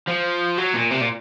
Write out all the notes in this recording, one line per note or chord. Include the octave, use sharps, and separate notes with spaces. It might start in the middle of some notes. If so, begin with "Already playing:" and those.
F3
F#3
A#2
C3
A#2